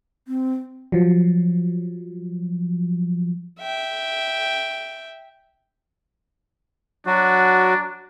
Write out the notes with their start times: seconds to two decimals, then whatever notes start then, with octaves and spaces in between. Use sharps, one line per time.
0.28 C4
0.92 F3 F#3
3.60 E5 G5
7.07 F#3 D4 F#4